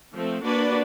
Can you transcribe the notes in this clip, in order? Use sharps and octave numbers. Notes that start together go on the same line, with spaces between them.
F3 A3 C4
A#3 D4 F#4 B4 D5